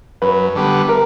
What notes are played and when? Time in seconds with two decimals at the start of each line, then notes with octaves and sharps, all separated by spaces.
0.22 F#2 B4
0.55 D3 G3 B3
0.89 A#4